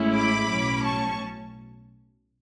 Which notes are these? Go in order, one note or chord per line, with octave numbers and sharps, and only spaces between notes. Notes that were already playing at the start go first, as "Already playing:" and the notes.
Already playing: A1 A2 G#3 C#4 E4
B5 D6
B1 A2 F#3 C#4
A5 C#6